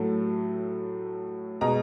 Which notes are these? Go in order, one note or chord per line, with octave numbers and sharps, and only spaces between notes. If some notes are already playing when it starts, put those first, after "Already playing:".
Already playing: A2 F#3 A3
B2 G#3 A#5